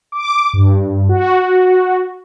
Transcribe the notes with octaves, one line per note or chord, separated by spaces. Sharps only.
D6
G2
F#4